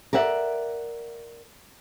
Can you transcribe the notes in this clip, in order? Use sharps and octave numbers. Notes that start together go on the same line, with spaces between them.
A#4 D5 E5 F#5